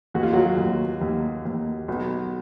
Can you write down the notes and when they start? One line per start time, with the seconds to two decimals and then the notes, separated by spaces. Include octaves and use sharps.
0.14 D#2 F#4
0.23 F4
0.33 F#3 F#4
0.57 D#2
1.01 D#2
1.45 D#2
1.88 B1